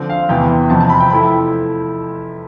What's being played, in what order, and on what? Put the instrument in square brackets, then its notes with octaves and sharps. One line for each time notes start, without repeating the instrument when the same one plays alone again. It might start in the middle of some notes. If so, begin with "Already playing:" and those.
Already playing: [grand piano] D3 F3 C4
F5
E2 C3 E3 B3 G5
F2 C3 F3 C4 A5
A5
B5
G5
F3 A3 E4 B5